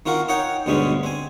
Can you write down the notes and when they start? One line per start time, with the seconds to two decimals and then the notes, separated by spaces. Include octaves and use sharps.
0.06 D#3 C4 F4 F#4 A#4
0.29 D#4 C#5 F#5 G5
0.66 D2 G2 B2 G#3 C#4
1.03 C4 G#5